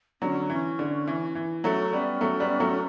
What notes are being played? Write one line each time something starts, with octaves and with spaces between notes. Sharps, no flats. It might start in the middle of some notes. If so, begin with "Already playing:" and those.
D3 F#3 C#4
E3 C#4
D3
E3
E3
F#3 A3 C#4
G3 B3 C#4
F#3 A3
G3 B3
F#3 A3